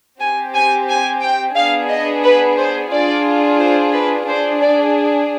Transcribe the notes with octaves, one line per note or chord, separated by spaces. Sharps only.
C4 G4 G#5
G#5
G#5
G5
B3 D4 G#4 F5
D#5
B4
C5
D4 F4 G#4 D5
C5
B4
D4 G#4 C5
D5